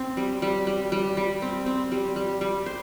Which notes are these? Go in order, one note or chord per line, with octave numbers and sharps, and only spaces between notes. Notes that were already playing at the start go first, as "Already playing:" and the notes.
Already playing: C4
G3
G3
G3
G3
G3
C4
C4
G3
G3
G3
C5